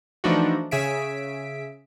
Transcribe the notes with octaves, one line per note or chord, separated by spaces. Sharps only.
E3 F3 A3 D4 D#4 F#4
C#3 G#4 E5 B6 D7